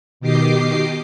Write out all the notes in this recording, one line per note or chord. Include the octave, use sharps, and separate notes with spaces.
B2 D#3 G4 D#5 D6 C7